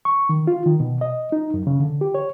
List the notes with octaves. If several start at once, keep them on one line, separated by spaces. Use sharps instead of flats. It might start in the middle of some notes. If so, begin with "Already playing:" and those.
C#6
D#3
F4
D#3
B2
D#5
D#4
F#2
C#3
D3
G4
C#5